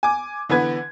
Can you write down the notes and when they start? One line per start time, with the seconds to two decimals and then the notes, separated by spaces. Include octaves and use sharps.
0.03 G#5 D6
0.49 D3 E3 B3 B4 G#6